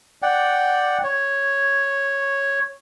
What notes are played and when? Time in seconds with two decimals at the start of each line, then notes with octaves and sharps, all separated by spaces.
0.22 D5 F#5 G5
1.03 C#5